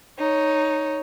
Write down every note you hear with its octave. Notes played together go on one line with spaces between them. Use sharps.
D#4 C#5